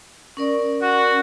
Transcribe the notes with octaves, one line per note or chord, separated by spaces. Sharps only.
C#4 A#4 D5
F#4